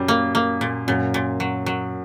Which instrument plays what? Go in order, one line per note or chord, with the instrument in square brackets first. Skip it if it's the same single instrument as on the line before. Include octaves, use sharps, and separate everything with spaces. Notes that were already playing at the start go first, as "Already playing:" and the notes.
Already playing: [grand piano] F#2 [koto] A#2 G3
[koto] A#3
A#3
A#2
[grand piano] F#2 [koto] A#2
[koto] A#2
F#3
F#3